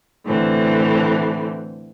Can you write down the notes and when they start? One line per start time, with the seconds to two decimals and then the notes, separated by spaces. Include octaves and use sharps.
0.25 A2 D3 E3 C4